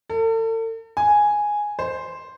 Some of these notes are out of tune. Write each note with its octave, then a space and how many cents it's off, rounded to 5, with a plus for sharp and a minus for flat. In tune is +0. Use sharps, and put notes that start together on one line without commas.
A4 +40
G#5 +0
C5 +0